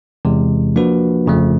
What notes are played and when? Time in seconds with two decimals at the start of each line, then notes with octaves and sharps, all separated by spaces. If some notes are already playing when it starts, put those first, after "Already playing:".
0.25 E2 C3 E3 G#3
0.76 F3 A#3 D4 F#4 B4
1.26 G1 F2 C#3 F3 A3